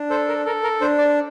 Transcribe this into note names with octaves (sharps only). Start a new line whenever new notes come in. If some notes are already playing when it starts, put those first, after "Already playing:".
Already playing: D4
A4 C5
A#4
A4 A#4
A#4
D4 C5
D5